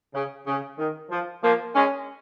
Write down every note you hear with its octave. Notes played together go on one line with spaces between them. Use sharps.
C#3
C#3
D#3
F3
F3 A#3
G#3 C#4